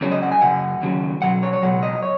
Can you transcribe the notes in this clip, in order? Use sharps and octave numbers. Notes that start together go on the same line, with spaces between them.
C#2 C#3 F#3 C#4
D#5
F#5
G#5
F#2 C#3 F#3 F#5
D#2 C#3 F#3
B1 B2 F#3 F#5
C#5
C#5
C#2 B2 F#3 F#5
D#5
C#5